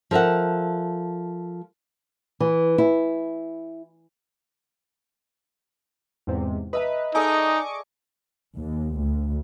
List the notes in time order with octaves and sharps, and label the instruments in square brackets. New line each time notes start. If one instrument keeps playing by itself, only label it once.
[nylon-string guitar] F3 A4 A#4 E5 F#5
E3
E4
[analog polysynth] E2 G#2 C3
[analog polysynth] B4 [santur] D#5 E5 A#5
[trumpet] D#4 [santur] G#4 A4 D5 [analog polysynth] D#5 C#6 D6
[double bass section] D#2
D2